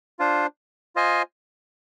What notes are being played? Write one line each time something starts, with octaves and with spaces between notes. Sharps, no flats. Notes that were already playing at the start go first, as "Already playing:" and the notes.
D4 F4 C5
F4 C5 D#5 G#5